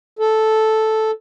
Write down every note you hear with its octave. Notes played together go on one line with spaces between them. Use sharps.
A4